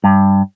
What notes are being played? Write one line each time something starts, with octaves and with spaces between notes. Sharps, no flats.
G2